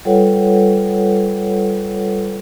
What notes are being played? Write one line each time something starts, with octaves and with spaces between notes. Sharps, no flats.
G3 F4 A4 B4 C#5 F#5